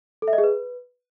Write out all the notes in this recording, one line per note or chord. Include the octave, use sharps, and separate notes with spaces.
A4
E5
D#5
G#4
B4